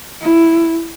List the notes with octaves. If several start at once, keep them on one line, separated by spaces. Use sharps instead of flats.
E4